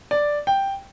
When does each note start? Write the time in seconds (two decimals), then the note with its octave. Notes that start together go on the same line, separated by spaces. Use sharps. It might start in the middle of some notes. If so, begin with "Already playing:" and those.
0.11 D5
0.47 G5